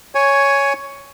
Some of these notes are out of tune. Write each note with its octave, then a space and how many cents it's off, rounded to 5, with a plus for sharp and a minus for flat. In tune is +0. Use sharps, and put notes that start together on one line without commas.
C#5 +5 G#5 +0